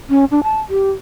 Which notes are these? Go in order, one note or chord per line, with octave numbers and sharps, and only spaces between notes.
C#4
D4
A5
G4